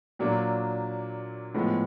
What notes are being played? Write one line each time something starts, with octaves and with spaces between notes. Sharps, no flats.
A#2 F#3 A#3 D4
A2 F3 G#3 B3